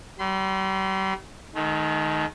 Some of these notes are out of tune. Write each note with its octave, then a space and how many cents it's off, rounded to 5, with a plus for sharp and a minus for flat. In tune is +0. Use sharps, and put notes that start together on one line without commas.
G3 -40 C6 -35
D#3 +0 A3 -45